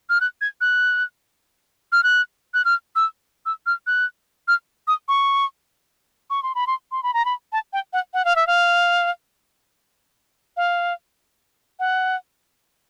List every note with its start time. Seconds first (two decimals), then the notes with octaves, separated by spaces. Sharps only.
0.09 F6
0.21 F#6
0.41 G#6
0.61 F#6
1.92 F6
2.03 F#6
2.54 F#6
2.65 F6
2.96 E6
3.46 E6
3.66 F6
3.87 F#6
4.48 F6
4.88 D#6
5.08 C#6
6.30 C#6
6.43 C6
6.55 B5
6.67 C6
6.92 C6
7.03 B5
7.14 A#5
7.25 B5
7.52 A5
7.73 G5
7.93 F#5
8.14 F#5
8.25 F5
8.36 E5
8.47 F5
10.57 F5
11.79 F#5